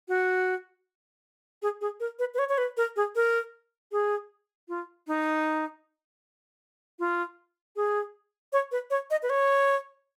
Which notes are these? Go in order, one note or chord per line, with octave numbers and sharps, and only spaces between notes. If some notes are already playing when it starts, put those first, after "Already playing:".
F#4
G#4
G#4
A#4
B4
B4
C#5
C#5
B4
A#4
G#4
A#4
G#4
F4
D#4
F4
G#4
C#5
B4
C#5
D#5
B4
C#5